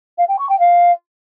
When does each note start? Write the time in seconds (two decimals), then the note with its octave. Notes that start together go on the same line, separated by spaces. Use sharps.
0.18 F5
0.28 G5
0.39 C#6
0.49 G5
0.59 F5